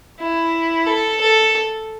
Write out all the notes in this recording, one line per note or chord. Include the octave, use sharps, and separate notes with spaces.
E4
A4
A4